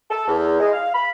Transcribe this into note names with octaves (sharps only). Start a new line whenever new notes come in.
A4
E2
G#3
F5
B5